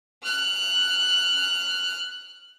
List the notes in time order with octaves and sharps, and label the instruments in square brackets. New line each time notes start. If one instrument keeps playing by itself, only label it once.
[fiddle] F6 F#6